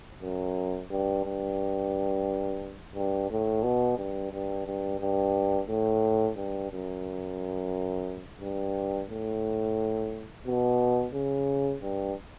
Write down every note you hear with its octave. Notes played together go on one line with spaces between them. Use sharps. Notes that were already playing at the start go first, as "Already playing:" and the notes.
F#2
G2
G2
G2
A2
B2
G2
G2
G2
G2
A2
G2
F#2
G2
A2
B2
C#3
G2